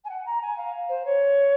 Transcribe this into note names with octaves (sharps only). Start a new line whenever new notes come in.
G#5
F#5
A#5
G#5
F5
C5
C#5